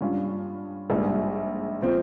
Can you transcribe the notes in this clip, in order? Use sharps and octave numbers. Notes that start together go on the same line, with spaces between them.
G2 G3 C#4 F4
A#1 G#2 G3
F3 C4